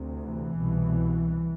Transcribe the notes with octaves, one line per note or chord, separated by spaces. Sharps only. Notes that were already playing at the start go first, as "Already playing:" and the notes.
Already playing: D2 C3
E3
C2 B2